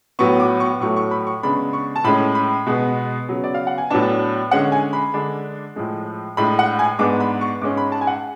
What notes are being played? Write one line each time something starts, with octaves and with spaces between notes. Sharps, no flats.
A2 F#3 B3 C#6
D6
C#6
A2 F#3 A3 C#6
C#6
B5
C#6
C#3 G#3 B3 D4 B5
C#6
A5
A2 G#3 C#4 B5
B5
B2 G#3 B3
C#3 F#3 B3
D5
F5
F#5
G#5
A2 F#3 B3 D4 A5
D3 G#3 C#4 F#5
G#5
B5
D3 G#3 D4
A2 F3 G#3
A2 G#3 D4 B5
F#5
G#5
G#2 G#3 B3 D4 D6
B5
C#6
G#2 G#3 C#4 D6
B5
A5
G#5
F#5